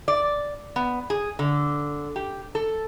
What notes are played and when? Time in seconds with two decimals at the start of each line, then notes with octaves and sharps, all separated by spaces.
0.08 D5
0.76 B3
1.10 G#4
1.39 D3
2.16 G4
2.55 A4